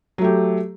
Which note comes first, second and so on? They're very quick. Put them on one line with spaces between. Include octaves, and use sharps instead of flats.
F#3 A3 G4